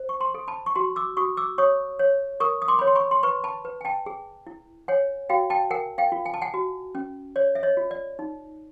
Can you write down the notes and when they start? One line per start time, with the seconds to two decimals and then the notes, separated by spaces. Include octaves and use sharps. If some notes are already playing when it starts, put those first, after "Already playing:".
Already playing: C5
0.09 C#6
0.20 A#5 C6
0.34 A4
0.48 A5 B5
0.66 C#6
0.75 F#4 A#5 C6
0.96 D6 E6
1.17 F#4 C#6 D#6
1.37 D6 E6
1.58 C#5 C#6 D#6
1.99 C#5
2.40 A#4 C#6 D#6
2.62 D#6
2.68 C6 D6
2.79 C#5 B5
2.87 C6
2.96 B5 C#6
3.11 C6
3.23 B4 B5 C#6
3.44 A5 B5
3.65 B4
3.81 G#5
3.85 G5 A5
4.06 G#4
4.47 E4
4.88 C#5 F#5 G#5
5.29 F#4 F5 G5
5.50 G5 A5
5.70 A#4 F#5 G#5
5.98 F5 G5
6.12 F4
6.26 G#5
6.34 A5
6.41 F#5 G#5
6.54 F#4
6.95 C#4
7.36 C#5 D5
7.55 E5
7.63 C#5 D#5
7.77 F4
7.91 D5
8.19 D#4